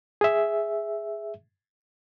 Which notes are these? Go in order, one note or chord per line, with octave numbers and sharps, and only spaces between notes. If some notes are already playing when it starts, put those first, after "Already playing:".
G#4 E5